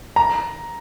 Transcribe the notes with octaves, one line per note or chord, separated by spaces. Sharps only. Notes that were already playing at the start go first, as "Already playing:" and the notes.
A#5